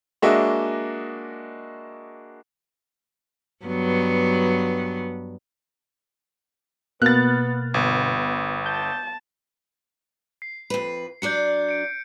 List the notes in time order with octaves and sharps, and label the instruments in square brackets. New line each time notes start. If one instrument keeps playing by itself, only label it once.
[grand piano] G#3 A#3 D4 F#4 D#5 E5
[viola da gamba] G2 F#3 B3
[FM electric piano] B2 A#3 F6 [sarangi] B3 [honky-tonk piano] F#6 A6
[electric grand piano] G1 [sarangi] B3
[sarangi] A5 [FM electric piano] G6
[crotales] C7
[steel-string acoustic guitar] F2 B4
[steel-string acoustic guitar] F#3 D4 D5 [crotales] G6 C#7
[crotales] C#7 D7